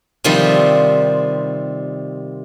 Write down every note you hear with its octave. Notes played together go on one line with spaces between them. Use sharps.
C3 D#3 F3 G3 C4